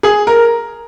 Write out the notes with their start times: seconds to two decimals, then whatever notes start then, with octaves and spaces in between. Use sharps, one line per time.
0.03 G#4
0.27 A#4